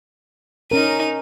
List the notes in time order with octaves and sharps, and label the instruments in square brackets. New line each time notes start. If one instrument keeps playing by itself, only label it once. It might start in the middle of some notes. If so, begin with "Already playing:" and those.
[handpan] C#4 A#4 [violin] D#4 D#7